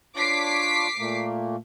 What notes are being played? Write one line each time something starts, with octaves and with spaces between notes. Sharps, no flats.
D4 F4 C#5 D6 B6 C7
A#2 A3 A#3